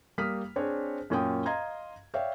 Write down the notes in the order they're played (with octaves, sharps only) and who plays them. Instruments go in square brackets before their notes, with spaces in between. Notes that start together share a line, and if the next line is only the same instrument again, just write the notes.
[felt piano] G3 A#3 D#6 F6 B6
C4 D4 G#4 C#5
F#2 A#2 C#4 A#4 G5 D#6
D#5 F5 A#5 C6 G#6
C#5 D5 E5 F5 G5